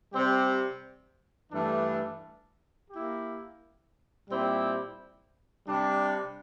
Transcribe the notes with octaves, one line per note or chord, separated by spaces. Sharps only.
C3 G3 C4 G4 C5
G2 E3 A3 D4 A4
A#3 E4 G4
A#2 G3 C4 E4 G4
C3 G3 D4